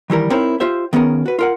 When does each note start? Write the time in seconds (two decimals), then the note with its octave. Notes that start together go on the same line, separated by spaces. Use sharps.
0.10 D#3 E3 G3 A#4
0.30 C4 D#4 E4 A#4 C5 C#5
0.60 F4 G4 C5 E5
0.93 D#3 B3 C#4 G#4 A#4
1.26 F#4 B4
1.39 F4 A#4 F#5